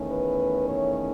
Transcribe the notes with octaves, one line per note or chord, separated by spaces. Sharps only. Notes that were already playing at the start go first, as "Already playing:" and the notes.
Already playing: E2 D#3 A3 C#4
B4
C#5